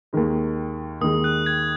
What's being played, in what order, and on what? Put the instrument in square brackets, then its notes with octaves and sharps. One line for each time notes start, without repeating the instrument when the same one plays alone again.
[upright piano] D#2 D#3 G#3
[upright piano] D#2 D#3 G#3 [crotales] D#6
[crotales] F#6
G#6